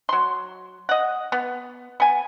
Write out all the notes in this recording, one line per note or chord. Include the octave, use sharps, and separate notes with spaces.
F#3 C6
D#5 F#5
B3
B3 G#5